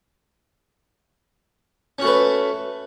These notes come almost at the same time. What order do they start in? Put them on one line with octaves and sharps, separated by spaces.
C#4 F#4 A3 B4